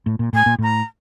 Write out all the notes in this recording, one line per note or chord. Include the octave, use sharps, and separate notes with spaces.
A2
A#2
A2 G#5
A#2
A2 A#5